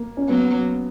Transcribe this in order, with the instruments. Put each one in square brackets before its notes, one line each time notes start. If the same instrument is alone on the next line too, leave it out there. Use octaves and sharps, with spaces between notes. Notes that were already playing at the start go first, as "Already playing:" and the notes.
Already playing: [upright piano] A#3
C#4
[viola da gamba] F#3 A#3 [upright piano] B3